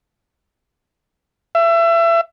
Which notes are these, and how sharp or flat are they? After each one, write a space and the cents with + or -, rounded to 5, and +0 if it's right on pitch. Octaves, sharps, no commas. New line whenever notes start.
E5 +30